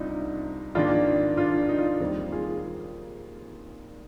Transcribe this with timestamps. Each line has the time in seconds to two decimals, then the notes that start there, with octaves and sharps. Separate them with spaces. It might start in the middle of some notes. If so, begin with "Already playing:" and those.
Already playing: C2 C3 G3 D4 D#4 F4
0.75 G#2 D#3 A#3 D4 F4
1.37 D4 F4
1.69 D#4
1.79 F4
1.88 D#4
2.00 D#2 D#3 G3 C4
2.32 F4 G#4